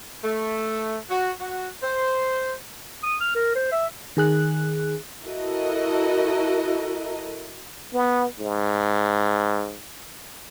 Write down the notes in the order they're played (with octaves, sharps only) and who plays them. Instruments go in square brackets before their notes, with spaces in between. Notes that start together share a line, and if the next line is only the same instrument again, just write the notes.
[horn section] A3
F#4
F#4
C5
[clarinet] D#6
F6
A#4
C5
E5
[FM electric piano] D#3 G#4 F#6
[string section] E4 F#4 A4 A#4 D#5
[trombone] B3
G#2